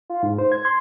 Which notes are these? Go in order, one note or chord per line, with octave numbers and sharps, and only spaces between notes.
F4
G#2
C5
G#6
C6